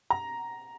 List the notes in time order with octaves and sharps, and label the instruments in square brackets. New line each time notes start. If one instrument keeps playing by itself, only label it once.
[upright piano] A#5